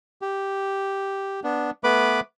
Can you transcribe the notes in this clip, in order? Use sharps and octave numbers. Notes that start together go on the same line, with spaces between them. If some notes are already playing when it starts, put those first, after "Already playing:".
G4
B3 D4
A3 B3 B4 B5 D6